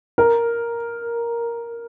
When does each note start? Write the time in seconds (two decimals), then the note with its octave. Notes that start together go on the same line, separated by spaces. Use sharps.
0.18 A#4